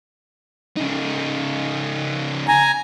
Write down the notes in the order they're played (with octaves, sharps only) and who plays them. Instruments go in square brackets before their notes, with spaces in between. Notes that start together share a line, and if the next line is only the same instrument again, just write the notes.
[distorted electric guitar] C#3 D#4
[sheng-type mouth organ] G#5 A#5